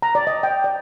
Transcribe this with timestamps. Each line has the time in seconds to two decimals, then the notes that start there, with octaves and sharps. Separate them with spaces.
0.02 A#5
0.15 D5
0.27 D#5
0.43 G5
0.64 D5